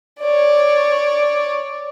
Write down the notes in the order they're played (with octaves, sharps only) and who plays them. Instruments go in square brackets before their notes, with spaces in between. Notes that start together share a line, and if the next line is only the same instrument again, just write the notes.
[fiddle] C#5 D5